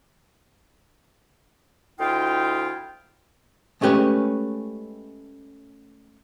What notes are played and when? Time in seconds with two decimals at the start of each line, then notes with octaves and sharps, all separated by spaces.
1.99 D2 E4 F4 D#5 G5
3.81 G#3 A3 C#4 G4 B4 C#5